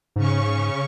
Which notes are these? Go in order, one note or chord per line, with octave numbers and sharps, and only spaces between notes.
G#2 C#3 C#4 C#6